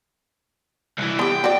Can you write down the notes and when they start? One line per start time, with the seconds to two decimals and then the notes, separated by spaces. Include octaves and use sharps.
0.98 C2 E3
1.19 B3 G4 G5
1.44 F#4 D5